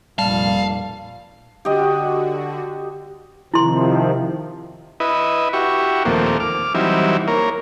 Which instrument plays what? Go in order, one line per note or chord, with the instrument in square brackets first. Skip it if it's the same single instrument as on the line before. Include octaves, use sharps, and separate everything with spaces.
[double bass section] F1 A#2 [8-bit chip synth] G3 [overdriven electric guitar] F5 [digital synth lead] A5
[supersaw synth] D3 F#4 [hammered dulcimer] G4 D#5
[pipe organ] C3 D#3 F3 [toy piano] E4 C6
[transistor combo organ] E4 B4 D#5
E4 F#4 G4 C#6
D#2 A#2 F3 A3 A#3 C4
D6 F6
E3 F#3 G3 C4 D#4 E4
A#3 A#4 C#5